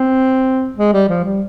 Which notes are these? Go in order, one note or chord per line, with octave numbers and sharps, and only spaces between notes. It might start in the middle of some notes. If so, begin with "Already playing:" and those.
Already playing: C4
G#3
G3
F3
G3